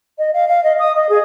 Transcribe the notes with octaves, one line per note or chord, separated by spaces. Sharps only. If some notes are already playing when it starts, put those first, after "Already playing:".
D#5
F5
F5
D#5
D#6
D#5
G#4